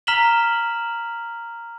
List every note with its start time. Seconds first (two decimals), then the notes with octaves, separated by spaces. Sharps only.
0.07 A#5 F6 B6 E7 F#7 G7